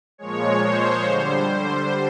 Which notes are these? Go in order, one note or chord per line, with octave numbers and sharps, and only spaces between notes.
A#2 F3 G#3 C#5
C5
D3 G3
C5